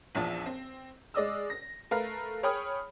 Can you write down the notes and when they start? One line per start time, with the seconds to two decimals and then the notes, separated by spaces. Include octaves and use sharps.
0.15 A#1 E2 F3 A5
0.46 C4
1.14 G#3 D5 D#5 D#6 E6
1.50 A#6
1.91 A3 A#4 B4 F5
2.43 G#4 C#5 G5 B5 D#6 F6